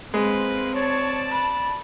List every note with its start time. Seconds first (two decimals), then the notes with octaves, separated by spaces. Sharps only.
0.14 G#3 A#3 C4 G#4 B4
0.73 C#5 D5 A5
1.31 B5